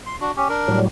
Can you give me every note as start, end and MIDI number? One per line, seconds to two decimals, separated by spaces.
0.06 0.16 84
0.21 0.32 62
0.21 0.32 66
0.37 0.48 61
0.37 0.48 67
0.49 0.79 62
0.49 0.79 70
0.68 0.88 45
0.68 0.88 54
0.68 0.88 55